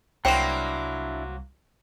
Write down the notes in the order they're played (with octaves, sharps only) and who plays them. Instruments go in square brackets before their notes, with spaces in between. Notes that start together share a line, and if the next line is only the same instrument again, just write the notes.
[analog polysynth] C2 [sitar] F#3 A#3 C5 [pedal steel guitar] D4 E4 [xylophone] G5 E7